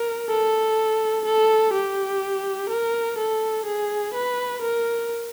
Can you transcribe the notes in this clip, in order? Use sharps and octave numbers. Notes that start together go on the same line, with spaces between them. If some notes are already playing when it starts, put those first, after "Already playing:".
Already playing: A#4
A4
A4
G4
A#4
A4
G#4
B4
A#4